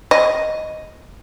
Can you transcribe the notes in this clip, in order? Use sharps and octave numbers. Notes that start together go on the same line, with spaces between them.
D#5